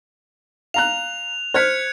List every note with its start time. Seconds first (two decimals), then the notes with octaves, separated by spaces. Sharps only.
0.74 F5 A#5 F#6 F7
1.54 C5 F6 F#6 G#6 B6 C#7